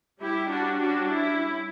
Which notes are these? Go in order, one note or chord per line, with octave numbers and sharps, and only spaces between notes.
G3 C#4 E4 G4
D4 F#4
D4 F#4
E4